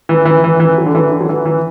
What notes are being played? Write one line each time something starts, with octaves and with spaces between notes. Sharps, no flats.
E3
E3
E3
E3
F#3
D3
E3
D3
F#3
E3
E3